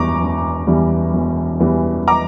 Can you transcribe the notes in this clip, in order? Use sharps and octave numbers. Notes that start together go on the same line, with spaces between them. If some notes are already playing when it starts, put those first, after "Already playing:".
Already playing: E1 E2 E3 G3 A#5 C#6 D6
E1
E2 E3 G3
E1
E2 E3 G3
A#5 D6